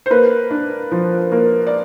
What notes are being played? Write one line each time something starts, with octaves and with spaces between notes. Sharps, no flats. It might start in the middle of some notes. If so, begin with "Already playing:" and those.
C5
A#3 B4
D4
F3
A#3
D5